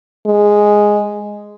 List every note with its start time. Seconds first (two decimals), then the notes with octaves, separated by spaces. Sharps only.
0.26 G#3